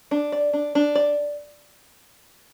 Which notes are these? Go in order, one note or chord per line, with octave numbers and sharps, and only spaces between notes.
D4
D5
D4
D4
D5